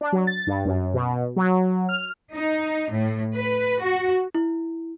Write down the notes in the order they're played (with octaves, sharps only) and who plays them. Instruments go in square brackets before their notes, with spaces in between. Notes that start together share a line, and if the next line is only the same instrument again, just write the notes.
[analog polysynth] D4
F#3
A6
G2
F#2
B2
F#3
F6
[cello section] D#4
A2
B4
F#4
[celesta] E4